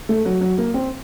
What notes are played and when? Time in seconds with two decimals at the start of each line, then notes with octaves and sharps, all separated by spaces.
0.09 A3
0.25 F#3
0.41 F#3
0.58 A#3
0.74 C4